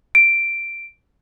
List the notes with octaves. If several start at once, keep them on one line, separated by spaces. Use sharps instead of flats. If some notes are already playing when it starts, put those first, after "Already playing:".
D7